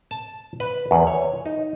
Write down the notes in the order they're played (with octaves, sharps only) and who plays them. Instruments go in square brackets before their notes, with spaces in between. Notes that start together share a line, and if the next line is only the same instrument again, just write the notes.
[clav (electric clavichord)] A5
B4
E2
C#5
D#4